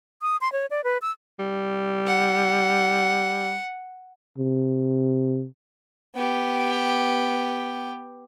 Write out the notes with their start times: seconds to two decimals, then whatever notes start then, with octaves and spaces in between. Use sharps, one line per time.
0.22 D#6
0.41 C6
0.53 C#5
0.71 D5
0.84 B4
1.02 E6
1.39 G3
2.07 F#5
4.38 C3
6.16 B3 G4